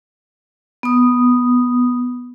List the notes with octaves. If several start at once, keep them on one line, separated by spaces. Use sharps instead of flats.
B3 D#6